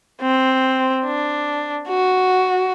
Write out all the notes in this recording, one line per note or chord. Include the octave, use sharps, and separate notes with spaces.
C4
D4
F#4